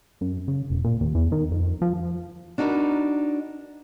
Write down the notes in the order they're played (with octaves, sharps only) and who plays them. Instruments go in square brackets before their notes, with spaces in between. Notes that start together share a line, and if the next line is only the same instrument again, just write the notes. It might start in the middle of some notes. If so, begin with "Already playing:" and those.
[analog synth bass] F#2
C#3
E1
A#2
D#2
E2
D#3
F2
F3
[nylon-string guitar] D4 D#4 F#4 A#4 B4